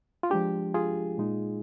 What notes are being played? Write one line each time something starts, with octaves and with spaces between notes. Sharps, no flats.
F4
F3 G#3 D4 G4
F4 G#4
A#2 G#3 D#4